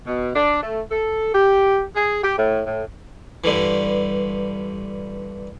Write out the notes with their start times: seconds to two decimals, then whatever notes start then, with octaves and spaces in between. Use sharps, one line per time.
0.07 B2
0.35 D4
0.63 A3
0.91 A4
1.34 G4
1.96 G#4
2.23 G4
2.38 A2
2.66 A2
3.44 G2 D3 E3